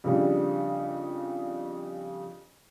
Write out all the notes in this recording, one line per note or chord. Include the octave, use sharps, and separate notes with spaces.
F2 C#3 G3 D4